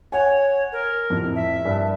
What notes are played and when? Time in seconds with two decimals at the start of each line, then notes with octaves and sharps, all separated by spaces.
0.12 C#5 F#5 G#5
0.72 A#4
1.10 F2 A2 C3
1.35 E5
1.65 G2 A#4 A5